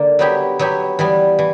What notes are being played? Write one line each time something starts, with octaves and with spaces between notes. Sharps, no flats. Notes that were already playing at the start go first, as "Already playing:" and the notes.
Already playing: D3 A#3 D4
F#3 B3 E4 G4
F#3 B3 E4 G4
E3 G3 B3
E3